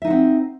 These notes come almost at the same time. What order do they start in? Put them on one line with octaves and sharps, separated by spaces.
E5 D#4 F#5 C4